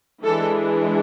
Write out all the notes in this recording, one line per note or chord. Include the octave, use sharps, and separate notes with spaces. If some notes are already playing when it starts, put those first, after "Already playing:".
E3 G#3 D4 A4